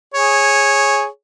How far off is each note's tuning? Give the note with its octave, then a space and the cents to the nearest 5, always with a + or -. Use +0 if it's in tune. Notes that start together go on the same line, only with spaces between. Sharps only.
G#4 +0 C#5 -10